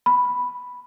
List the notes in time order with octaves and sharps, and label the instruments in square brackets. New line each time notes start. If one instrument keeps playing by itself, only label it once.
[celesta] B5